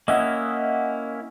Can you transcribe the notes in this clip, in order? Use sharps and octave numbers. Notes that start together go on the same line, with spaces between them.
A#3 C#4 E4 D#5 E5 F#5